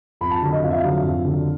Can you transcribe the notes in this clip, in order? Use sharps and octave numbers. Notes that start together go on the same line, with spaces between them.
F2 B5
A5
D3 F#3
D#5
F2 F5
E5
F5
D3 F#3
F2
D3 F#3